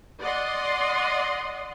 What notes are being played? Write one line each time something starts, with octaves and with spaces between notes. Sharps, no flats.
D5 D#5 F#5 C6